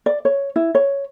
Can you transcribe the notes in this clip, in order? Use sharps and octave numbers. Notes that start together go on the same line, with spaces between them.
D5
C#5
E4
C#5